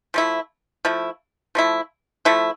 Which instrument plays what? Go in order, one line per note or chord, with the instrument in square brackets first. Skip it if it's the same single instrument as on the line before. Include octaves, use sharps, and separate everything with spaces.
[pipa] F3 A3 E4
F3 A3 E4
F3 A3 E4
F3 A3 E4